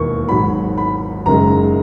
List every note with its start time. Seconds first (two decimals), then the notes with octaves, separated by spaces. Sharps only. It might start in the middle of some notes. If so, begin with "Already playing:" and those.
Already playing: E1 D#2 C#6
0.29 G#1 G#2 F#3 B5
0.78 B5
1.26 F#1 F#2 D#3 G#3 A#5